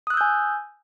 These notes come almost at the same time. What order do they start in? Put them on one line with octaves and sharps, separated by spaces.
D#6 F#6 E6 G6 G#5